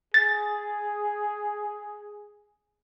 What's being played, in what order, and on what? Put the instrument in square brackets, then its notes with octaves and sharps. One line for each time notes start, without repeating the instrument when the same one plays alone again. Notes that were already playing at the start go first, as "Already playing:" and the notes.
[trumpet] G#4 [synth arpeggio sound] A6